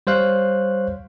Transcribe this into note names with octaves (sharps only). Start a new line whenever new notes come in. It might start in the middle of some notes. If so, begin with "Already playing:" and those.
G3 C5 C#5 F5 F#6